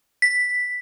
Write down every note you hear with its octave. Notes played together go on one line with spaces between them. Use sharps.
B6